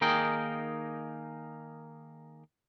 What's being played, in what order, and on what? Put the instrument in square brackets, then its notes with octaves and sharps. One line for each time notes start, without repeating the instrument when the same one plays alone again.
[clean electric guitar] D#3 A#3 D#4 G#4 A#4 G5